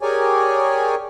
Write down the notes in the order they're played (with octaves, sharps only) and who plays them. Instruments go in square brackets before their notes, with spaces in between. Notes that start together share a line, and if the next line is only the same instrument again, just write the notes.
[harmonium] G4 G#4 A#4 C#5 D5 G#5